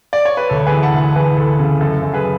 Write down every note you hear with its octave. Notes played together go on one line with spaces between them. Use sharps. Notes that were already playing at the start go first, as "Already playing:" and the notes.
D5
C#5
B4
D2 A4
G#4 B4
E3
F#5 A5
D2
E3 G#4 B4
D2 A4
C#3 G#4
F#2 A4
F#2
G#4 B4